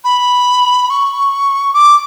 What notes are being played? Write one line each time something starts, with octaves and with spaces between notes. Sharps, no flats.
B5
C#6
D6